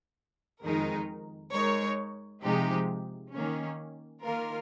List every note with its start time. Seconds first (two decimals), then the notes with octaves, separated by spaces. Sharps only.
0.64 F2 D#3 G#3 D#4 A#4
1.53 G#3 D#4 A#4 C#5
2.43 C3 F3 G#3 D#4 G4
3.33 D#3 A#3 C#4
4.22 D#3 A#3 F4 A#4